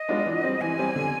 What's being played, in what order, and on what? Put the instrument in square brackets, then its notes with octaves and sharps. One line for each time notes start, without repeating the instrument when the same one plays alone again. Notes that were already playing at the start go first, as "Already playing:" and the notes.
Already playing: [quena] D#5
[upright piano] G#3 B3 D4 F4
E3
G3 C4
[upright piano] E3 [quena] G#5
[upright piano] G3 C4
D3